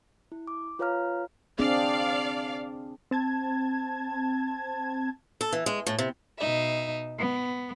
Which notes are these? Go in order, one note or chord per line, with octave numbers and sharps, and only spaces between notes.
E4
D6
F4 B4 C#5 F5 A#5 F6
C4 D4 G#4 D5 F5
C4 A5 G#6
A4
E3
G#3
A2
C3
B2 D#4 E5
B3